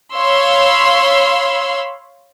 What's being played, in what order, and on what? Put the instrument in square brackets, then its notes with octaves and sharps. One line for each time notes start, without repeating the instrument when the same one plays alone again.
[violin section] C#5 F5 B5 C6 E6